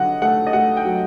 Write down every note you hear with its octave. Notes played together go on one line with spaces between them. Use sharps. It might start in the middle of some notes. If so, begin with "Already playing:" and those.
Already playing: D3 F#3 D#5 F#5
A3 F#5
D#5
A3 F#5
G5
F#3